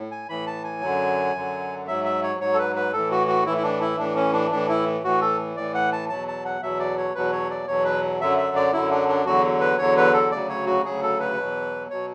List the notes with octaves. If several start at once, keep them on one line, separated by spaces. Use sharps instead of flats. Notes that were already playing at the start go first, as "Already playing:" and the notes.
Already playing: A2
G#5
A2 E3 B5
A5
G#5
F#2 D3 F#3
F#2 D3 F#3
G#2 F#3 E5
E5
C#5
G#2 F#3 C#5
A4
B4
B4
A2 E3 A4
F#4
F#4
A2 E3 E4
E4
D4
E4
A2 E3 D4
C#4
D4
A2 E3 D4
E4
A2 E3 F#4
A4
A2 E3 D5
F#5
A5
E2 B2 F#3 A5
A5
F#5
E2 B2 F#3 E5
D5
C#5
E2 B2 F#3 B4
C#5
D5
E2 B2 F#3 C#5
B4
F#2 D3 F#3 E5
E5
D5
F#2 D3 F#3 E4
D4
D4
E2 D3 F#3 F#4
B4
E2 D3 F#3 C#5
B4
A4
D2 C#3 F#3 D5
C#5
F#4
D2 C#3 F#3 G#4
A4
B4
E2 B2 F#3
B2 F#3 C#5